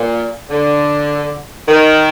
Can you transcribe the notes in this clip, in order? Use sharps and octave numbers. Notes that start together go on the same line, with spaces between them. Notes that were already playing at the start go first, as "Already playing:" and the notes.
Already playing: A#2
D3
D#3